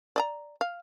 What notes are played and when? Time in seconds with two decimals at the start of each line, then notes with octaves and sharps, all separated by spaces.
0.16 D5 D#5 A#5
0.61 F5